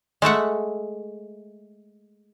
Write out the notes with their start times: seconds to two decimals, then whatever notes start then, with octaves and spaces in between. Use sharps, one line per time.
0.22 G#3 A3 E5 F#5